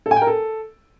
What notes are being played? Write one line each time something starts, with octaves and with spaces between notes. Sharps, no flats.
A4
G#5
G5
A#4
A4